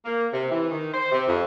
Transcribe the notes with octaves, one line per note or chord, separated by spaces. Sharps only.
A#3
C3
E3
D#3
C5
C3
F2